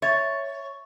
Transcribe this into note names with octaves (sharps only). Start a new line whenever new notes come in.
C#5 E5 C#6 A6